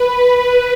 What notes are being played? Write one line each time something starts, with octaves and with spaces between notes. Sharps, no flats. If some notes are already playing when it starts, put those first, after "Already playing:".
Already playing: B4